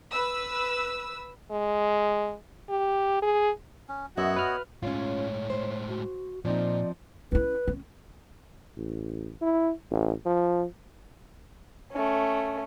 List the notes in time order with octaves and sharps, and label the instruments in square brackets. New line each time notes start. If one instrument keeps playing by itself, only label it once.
[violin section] B4 E6
[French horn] G#3
G4
G#4
[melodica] C#4
[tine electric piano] F#2 [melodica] B3 C#5 D#5 [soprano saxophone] F#4 [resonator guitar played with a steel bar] E5
[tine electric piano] B4 F6
[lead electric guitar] A2 G#3 [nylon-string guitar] C#4 F4 [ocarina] C#5
[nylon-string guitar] C5
[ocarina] F#4
[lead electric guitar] A#2 [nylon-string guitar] F3 C4 D#4 [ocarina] D5
[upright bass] C#4 E4 [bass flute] B4
[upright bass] C#4
[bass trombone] A1
E4
A1
F3
[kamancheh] A3 C#4